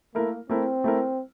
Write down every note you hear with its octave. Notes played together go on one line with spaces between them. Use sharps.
A3 A#3 E4 A#4
A3 C4 E4 A#4
A3 E4 A#4